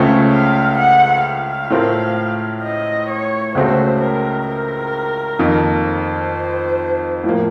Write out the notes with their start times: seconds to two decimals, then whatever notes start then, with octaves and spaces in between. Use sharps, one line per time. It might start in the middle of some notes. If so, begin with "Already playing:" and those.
Already playing: C#2 C#3 A3 C4 F4 C#5
0.32 F5
0.78 F#5
1.24 F5
1.70 A2 A3 C4 F4 A#4
2.63 D#5
3.09 C#5
3.55 C#2 C#3 A3 C4 F#4 C5
4.01 A#4
4.47 A#4
5.39 F2 D#3 A#3
5.85 C5
7.24 A2 F3 A#3